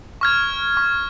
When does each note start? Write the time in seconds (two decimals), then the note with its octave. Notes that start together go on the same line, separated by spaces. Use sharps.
0.21 C#6 F6 G#6
0.77 C#6